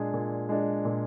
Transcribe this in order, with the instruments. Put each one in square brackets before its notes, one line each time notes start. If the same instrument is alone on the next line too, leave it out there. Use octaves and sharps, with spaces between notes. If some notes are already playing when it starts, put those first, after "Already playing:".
Already playing: [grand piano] A#2 G#3 D4 G#4
A#2
G#3 D4 G#4
A#2